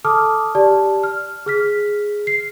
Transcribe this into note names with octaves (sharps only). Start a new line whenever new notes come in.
A4 A5 D6 D#6 F6
G4 D5 A5
F6
G#4 F6 B6
C7